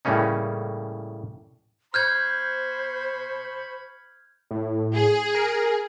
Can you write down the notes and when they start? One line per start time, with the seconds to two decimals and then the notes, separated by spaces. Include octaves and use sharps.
0.05 A2 C#3 G3 A#3 C#4 D#4
1.94 C5 B5 C#6 F6 G6 G#6
4.51 A2
4.96 G#4
5.35 A#4